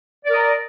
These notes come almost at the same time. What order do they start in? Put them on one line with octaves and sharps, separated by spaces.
D5 A#4 D#5 A#5